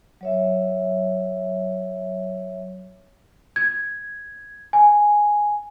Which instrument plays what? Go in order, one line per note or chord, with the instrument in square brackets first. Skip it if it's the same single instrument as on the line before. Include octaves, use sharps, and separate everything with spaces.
[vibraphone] F#3 C#5 E5
[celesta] G#6
G#5